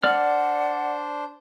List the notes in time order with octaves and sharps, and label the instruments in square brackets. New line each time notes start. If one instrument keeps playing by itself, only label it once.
[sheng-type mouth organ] D4 C5 [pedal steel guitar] D5 F6 [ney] F#5